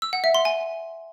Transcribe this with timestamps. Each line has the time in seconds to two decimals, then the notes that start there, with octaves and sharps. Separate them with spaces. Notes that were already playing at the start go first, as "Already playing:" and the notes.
0.02 E6
0.13 F#5
0.24 E5
0.34 C6
0.45 G#5